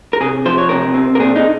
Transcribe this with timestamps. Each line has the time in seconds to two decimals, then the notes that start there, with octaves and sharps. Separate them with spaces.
0.13 A#4
0.21 C3 G#4
0.45 F3 C5
0.58 C#5
0.69 C3 A#4
0.94 C4
1.15 A#4
1.19 A#2 G#4
1.36 D#4